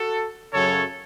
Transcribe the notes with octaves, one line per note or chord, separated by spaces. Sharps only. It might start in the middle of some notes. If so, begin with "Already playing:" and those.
Already playing: F#4 A4
F#2 C#3 F#3 A4 C#5